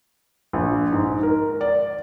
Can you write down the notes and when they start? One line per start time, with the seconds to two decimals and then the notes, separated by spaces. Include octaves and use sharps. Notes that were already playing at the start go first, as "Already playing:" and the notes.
0.53 A#1
0.92 G#2
1.23 A#4
1.61 D5